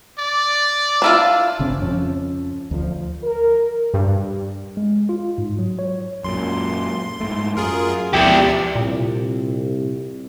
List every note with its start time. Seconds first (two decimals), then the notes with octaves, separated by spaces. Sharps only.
0.19 D5
1.02 D4 E4 F4
1.59 G1 C#3 C4 D4
1.81 F2 F3 C#4
2.71 D2 F3
3.24 A#4
3.94 G2
4.77 G#3
5.09 F4
5.38 G#2
5.59 F#3
5.79 C#5
6.24 F#2 A#2 C6
7.20 G#2 A3
7.57 F#2 F4 G#4 A#4
8.14 D2 F3 B3 E4 G4 D5
8.75 C2 A#2